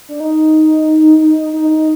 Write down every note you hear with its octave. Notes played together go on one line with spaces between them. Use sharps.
D4
D#4
D#4
D#4